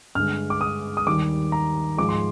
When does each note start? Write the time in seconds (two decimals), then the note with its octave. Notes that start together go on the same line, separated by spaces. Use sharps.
0.15 G2 D3 G#3 F6
0.50 D6
0.61 D#6
0.97 D#6
1.07 D#2 D#3 G3 D6
1.52 A#5
1.98 G#2 F3 G#3 D6
2.09 C6